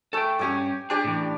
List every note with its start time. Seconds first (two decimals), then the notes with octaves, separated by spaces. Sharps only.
0.13 A3 A4 G5 G#5
0.39 G2 C#4 G4 G#5 D6
0.90 D4 G4 G#4 D5
1.04 A2 E3